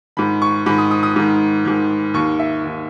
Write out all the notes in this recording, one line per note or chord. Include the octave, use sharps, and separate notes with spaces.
G#2 D#3 B5
C#6
G#2 D#3 B5
D#6
D#6
D#6
G#2 D#3
G#2 D#3
D#2 D#3 C#6
E5
D#2 D#3